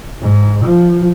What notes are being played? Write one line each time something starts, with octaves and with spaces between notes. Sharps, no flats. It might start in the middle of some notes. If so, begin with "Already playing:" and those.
G#2
F3